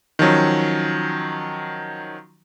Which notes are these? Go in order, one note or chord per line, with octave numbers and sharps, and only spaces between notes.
D#3 F3 F#3 C#4